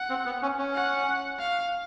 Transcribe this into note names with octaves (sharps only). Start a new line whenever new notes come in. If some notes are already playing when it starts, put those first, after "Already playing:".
Already playing: F#5
C4
B3
C#4
C#4
F#5
F5